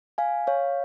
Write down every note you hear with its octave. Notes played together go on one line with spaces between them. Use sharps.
F5 G#5
C#5 F5